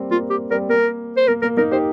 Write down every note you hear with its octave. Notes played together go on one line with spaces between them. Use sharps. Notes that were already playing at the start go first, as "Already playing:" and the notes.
Already playing: G3 A#3 C4
A#3 F4
G4
G3 C4 A#4
A#3 A#4
C5
A#3 A#4
A#3 A#4
A#3 D#4 A#4
D#4 G4 C5